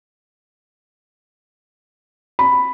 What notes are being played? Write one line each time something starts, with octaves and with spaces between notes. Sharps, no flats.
B5